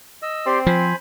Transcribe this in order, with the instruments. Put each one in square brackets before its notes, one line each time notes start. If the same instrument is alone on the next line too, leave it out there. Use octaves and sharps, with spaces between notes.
[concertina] D#5 E6
[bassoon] C4 [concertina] G4 D5 C6
[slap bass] F3 [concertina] C5 G#5 B5